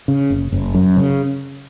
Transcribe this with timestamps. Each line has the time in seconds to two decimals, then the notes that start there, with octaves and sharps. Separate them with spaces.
0.08 C#3
0.30 F#1
0.52 F#1
0.74 F#2
0.97 C#3